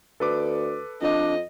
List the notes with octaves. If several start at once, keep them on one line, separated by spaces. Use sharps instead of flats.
D2 A4 B4 D6
F2 D4 D#5